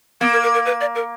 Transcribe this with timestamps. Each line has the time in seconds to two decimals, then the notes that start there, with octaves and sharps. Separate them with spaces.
0.21 A#3 B3
0.32 A#4
0.43 A#4
0.54 A#4
0.65 B4
0.81 D5
0.95 A#4